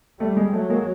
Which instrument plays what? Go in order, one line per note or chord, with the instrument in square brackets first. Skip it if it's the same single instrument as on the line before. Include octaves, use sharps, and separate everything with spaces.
[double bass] G3 [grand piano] A3
[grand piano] G#3
[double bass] F#3 [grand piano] A3
[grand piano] G#3 A#3